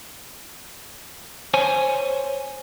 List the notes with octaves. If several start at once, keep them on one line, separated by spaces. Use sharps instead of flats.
C5 C#5 G#5